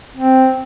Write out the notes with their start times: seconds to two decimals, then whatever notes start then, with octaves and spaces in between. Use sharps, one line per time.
0.16 C4